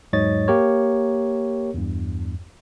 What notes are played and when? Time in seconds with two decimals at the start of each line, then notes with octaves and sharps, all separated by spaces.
0.13 E2 G#2 F#3 C#5 D#5 A6
0.48 A#3 G4 A#4 C#5
1.74 E2 G2